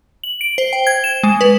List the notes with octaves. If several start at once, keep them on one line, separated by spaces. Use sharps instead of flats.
F#7
D7
C5
G5
G#6
E7
G#3
B4